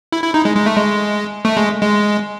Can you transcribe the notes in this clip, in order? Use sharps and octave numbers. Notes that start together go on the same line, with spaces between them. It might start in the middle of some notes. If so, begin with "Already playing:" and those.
E4
E4
D#4
G#3
G#3
A3
G#3
A3
G#3
G#3